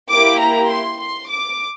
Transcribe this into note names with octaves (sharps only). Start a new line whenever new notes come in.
A#3 E4 G4 D6
A#5
C6
C6
D6